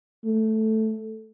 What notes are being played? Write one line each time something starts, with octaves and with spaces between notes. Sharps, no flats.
A3